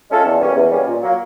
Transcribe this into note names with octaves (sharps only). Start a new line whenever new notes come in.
G#3 C#4 F4 A4
E2
B2 G3 A#3 C#4
E2
B2 G3 A#3 C#4
A#2
F#3 A#3